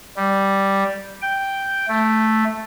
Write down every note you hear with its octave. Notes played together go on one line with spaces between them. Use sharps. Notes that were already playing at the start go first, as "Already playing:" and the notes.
G3
G5
A3